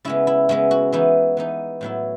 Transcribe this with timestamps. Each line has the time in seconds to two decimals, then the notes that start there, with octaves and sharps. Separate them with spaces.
0.05 C#3 G#3 B3 E4
0.27 E4
0.49 C#3 G#3 B3 E4
0.71 F#4
0.92 E3 B3 D#4 E4
1.37 E3 B3 D#4
1.81 A2 F#3 B3 E4